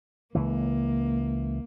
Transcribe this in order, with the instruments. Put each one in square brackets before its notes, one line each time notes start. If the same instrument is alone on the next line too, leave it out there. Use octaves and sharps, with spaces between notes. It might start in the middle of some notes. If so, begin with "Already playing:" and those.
[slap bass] C#2 E3 [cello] A#3